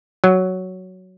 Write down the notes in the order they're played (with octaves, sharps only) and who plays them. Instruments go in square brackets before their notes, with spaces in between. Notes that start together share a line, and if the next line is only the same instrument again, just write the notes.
[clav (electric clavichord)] F#3